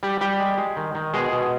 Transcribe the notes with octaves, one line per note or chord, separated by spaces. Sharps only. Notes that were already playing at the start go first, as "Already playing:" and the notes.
G3 G4
G3 G4
G#3
G#3
D#3
D#3
B2 G#3 G#4
B2